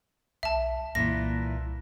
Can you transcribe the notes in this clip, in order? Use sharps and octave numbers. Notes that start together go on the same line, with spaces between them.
B1 E5 A5
C2 A#2 E3 E4 A#6